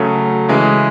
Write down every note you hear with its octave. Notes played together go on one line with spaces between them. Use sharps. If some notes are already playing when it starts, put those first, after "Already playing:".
Already playing: C#3 F#3 A3
C#3 E3 G#3